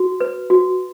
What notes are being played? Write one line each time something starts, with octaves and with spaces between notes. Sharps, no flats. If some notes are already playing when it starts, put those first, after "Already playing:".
Already playing: F#4
B4
F#4